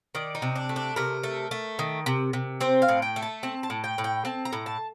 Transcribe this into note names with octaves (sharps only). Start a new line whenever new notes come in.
D#3 D5
D#4
C3
D4
A3
D4
C3 A#4
A3
A3
D#3
C3
C3
C4 C5
F5
A2
G5
A3
A5
C4 A5
A5
A2
G5
A2
G5
C4 A5
A#5
A2
A5